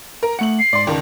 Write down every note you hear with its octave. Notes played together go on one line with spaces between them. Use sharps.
A#4
A3 F#5 C#7 F#7
C7
G#2 D5 C6
C#2 D#3 D5 A5